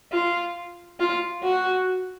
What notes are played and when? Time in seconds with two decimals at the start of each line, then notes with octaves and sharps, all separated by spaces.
0.12 F4
1.00 F4
1.43 F#4